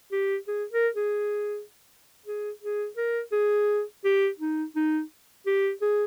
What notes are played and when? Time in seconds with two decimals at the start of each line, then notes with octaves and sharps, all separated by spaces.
0.12 G4
0.48 G#4
0.72 A#4
0.95 G#4
2.26 G#4
2.62 G#4
2.96 A#4
3.32 G#4
4.04 G4
4.39 D#4
4.76 D#4
5.46 G4
5.82 G#4